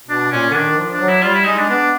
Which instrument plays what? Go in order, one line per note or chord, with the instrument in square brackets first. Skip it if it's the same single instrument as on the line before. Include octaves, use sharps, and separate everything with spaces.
[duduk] B2 [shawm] D4
[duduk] A#2 [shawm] C#4
[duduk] D3
[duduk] D#3 [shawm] D4
[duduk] F3
[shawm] D4
[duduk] F#3
[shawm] E4
[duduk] G3 [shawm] F4
[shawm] E4
[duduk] G#3 [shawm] D#4
[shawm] D4
[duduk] B3 [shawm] D4